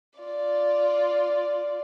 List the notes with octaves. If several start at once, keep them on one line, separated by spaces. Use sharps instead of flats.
F4 D5